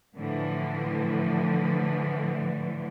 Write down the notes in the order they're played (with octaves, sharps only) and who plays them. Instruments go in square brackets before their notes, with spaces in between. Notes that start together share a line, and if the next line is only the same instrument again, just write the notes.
[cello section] A2 D3 E3 F3